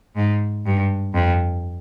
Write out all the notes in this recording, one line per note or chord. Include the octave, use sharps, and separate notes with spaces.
G#2
G2
F2